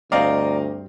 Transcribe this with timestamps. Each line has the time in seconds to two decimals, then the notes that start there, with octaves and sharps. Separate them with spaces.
0.12 D2 G2 C4 D5 D#5 F5 A#5 D6